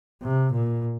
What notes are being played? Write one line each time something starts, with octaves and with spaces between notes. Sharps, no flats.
C3
A#2